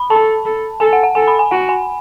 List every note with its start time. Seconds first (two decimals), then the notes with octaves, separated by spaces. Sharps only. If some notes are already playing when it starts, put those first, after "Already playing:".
Already playing: B5
0.10 A4 A5
0.45 A4
0.80 A4 G#5
0.93 F#5
1.03 F#5
1.15 A4 G#5
1.28 B5
1.39 G#5
1.51 F#4 F#5
1.69 G#5